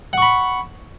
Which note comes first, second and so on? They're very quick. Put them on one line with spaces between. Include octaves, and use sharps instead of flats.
F#5 C#6 B5